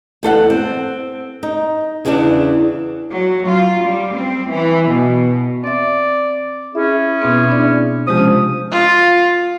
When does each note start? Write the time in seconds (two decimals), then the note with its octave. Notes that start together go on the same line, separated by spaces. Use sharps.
0.23 E2 A4 F5 F#5
0.50 C4
1.43 D#4
2.05 E2 C#3 E3 B3 D4
3.11 F#3
3.48 F4
3.83 G3
4.14 C4
4.51 E3
4.90 B2
5.64 C4 D5 E5
6.75 C#4 E4 G#4 E5
7.22 B2 B3 C4
7.49 D4 D5
8.07 C3 F3 G#3 C#4 G4 D#6
8.72 F4